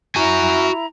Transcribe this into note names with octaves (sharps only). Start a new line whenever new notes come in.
E4 F#4 G#5 A#5